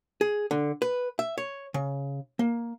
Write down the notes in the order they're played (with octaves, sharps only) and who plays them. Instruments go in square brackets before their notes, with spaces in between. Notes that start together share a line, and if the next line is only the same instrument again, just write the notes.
[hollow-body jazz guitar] G#4
D3
B4
E5
C#5
C#3
A#3